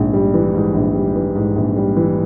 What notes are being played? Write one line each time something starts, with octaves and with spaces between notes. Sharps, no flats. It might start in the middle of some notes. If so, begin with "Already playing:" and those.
Already playing: A#1 G#2
G3
E3
G#2
A#1
G3
E3
G#2
A#1
G3
E3